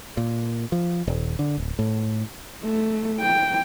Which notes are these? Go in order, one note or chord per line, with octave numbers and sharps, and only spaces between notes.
A#2
F3
D#1
D3
D1
A2
A3
G5